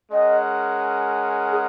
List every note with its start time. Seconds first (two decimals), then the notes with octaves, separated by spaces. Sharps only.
0.12 G#3 C#4 A#4 D#5 F#5
1.52 G#4